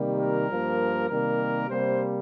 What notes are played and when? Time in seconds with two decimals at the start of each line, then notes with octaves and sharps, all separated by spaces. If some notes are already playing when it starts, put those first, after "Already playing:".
Already playing: C3 D#3 G3 A#3
0.18 A#4
0.48 G2 F3 A#3
1.09 C3 D#3 G3 A#3 A#4
1.69 C3 G3 A#3 C5